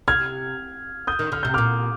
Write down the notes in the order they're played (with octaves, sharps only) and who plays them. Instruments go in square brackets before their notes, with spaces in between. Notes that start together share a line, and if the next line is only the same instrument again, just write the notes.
[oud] C3 [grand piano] F6 G#6
[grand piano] D#6 G6
[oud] D#3
[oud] D3 [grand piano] F6
[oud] C3 [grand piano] G6
[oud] A#2 [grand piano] D6 F6